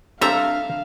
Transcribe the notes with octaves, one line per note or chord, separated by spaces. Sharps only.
G3 C4 D4 A4 E5 F5 A#5